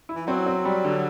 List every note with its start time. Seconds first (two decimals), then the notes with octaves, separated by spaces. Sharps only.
0.09 E4
0.16 E3
0.27 F#3 C4
0.46 C4
0.65 G3
0.84 D3